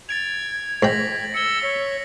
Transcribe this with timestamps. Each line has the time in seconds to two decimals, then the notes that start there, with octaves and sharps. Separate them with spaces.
0.09 G#6 A6 D7 F7
0.83 G#2 G5 A#6 B6 F#7
1.34 E6 C#7 G7
1.63 C#5 B6